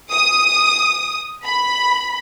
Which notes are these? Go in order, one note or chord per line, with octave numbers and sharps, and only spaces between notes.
D#6
B5